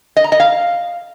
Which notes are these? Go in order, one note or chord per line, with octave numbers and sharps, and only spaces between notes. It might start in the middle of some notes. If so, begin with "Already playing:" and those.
D#5
A#5
D#5
F5